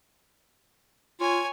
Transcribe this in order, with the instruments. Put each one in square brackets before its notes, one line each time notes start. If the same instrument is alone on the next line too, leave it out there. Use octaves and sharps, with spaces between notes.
[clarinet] F4 [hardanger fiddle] C#5 G#5